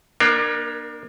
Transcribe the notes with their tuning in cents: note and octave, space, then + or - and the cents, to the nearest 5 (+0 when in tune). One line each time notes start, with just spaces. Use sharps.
A#3 +35 D4 +35 A#4 -5